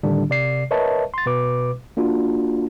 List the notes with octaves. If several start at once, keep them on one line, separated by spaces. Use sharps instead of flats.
A2 D3 D#3 G3 D4
C3 D5 C7
A#4 B4 C#5 D#5 E5 A5
C6 A6
B2 B4 D6
A#3 D4 F4 F#4